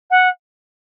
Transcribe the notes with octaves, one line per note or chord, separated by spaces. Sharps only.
F#5